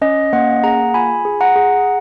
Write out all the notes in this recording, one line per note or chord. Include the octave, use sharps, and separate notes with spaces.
C#4 D#5
A#3 D#5 F#5
G#4 F#5 A#5
F4 G#5 B5
G#4
F#5 A#5
G#4